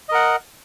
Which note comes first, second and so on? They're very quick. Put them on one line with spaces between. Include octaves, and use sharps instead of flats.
D#5 A#4 F#5